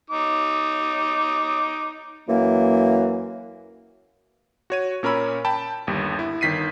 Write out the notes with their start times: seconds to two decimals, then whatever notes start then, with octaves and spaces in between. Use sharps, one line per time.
0.10 D#4 D6
2.28 F#2 E3 A#3
4.70 F#4 C#5 D#7
5.03 A#2 C#4 A#4 C#5 B5 E6
5.45 G5 A5 B5
5.87 G1 D#2 G3
6.19 E4
6.41 G1 D#3 B6 C7 D#7